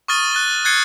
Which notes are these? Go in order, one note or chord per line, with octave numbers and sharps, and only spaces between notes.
C#6 D#6 F6 A6 D#7 G7
F#6 A6 D#7 G7
F#6 G#6 A6 C7 C#7 G7